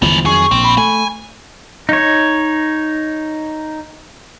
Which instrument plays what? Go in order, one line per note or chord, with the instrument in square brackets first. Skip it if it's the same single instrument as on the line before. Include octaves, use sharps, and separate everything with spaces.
[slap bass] G1 E2 F3 [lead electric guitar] G#3 B3
[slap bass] F2 D#3 F#3 [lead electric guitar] G#4 [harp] C#6
[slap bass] A#1 [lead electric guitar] C4
[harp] B5
[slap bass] A3 [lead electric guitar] G#5
[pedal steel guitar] D#4 C#5